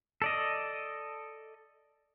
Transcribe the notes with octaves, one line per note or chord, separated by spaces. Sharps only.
A4 D5 D#5